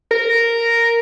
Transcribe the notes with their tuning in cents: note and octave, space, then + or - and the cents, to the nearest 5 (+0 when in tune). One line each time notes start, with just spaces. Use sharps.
A#4 -5